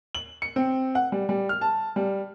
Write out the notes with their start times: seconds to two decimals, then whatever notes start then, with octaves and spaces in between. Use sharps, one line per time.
0.15 F#7
0.42 C#7
0.56 C4
0.95 F#5
1.12 G3
1.29 G3
1.49 F6
1.61 A5
1.96 G3